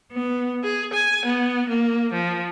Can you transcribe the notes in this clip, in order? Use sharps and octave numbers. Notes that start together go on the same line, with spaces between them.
B3
G#4
G#5
B3
A#3
F3